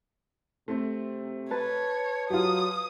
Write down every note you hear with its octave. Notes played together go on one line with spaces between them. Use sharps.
C3 A3 C4
B4 C#5 A5
F#3 F4 G4 D#6